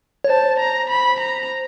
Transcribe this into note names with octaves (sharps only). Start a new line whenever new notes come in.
C#5
C5 A5
A#5
B5
A#5